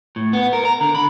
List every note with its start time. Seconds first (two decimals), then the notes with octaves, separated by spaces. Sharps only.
0.16 A2
0.33 B3
0.53 A#4
0.65 A#5
0.81 D3
0.95 B5